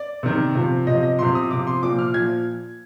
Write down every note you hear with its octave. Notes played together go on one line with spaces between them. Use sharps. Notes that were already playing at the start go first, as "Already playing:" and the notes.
Already playing: D5
C3 D#3
C3 F3
C3 F3 D#5
D#5
C3 F3 C6
D#6
C3 F3 D6
C6
A#2 F3 D6
F6
A#2 F3 G#6